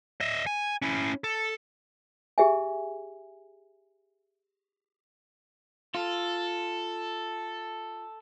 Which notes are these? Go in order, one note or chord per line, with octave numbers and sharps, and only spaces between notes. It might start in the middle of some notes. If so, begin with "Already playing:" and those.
D#5 E5
G#5
C#4 E4
A4
G4 G#4 E5 G#5
F4 A4